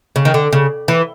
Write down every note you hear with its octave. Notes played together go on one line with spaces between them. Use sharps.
C#3
D#3
D3
C#3
E3